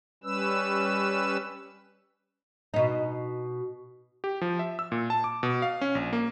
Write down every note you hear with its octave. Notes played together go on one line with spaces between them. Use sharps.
G3 C#4 B4 E6
B2 D#4
G4
F3
E5
E6
A#2
A5
D6
B2
F5
C#4
A#1
A#3